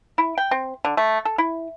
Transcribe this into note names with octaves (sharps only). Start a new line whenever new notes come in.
E4
G5
C4
D3
A3
A4
E4